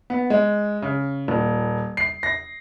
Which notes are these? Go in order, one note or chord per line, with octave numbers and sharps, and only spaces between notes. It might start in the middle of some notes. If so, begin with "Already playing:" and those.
B3
G#3
C#3
D#1
C7
A#6